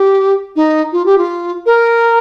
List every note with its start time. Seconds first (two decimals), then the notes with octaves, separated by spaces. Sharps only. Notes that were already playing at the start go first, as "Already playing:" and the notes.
Already playing: G4
0.56 D#4
0.93 F4
1.06 G4
1.18 F4
1.66 A#4